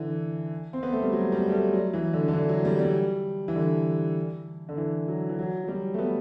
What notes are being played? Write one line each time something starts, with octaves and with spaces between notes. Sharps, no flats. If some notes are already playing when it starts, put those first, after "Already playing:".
Already playing: D3 E3
C4
B3
A3
G3
F#3
G3
A3
G3
F#3
E3
D3
D3
E3
F#3
G3
G3
E3
D3
D3
E3
F#3
E3
F#3
F#3
G3
A3
B3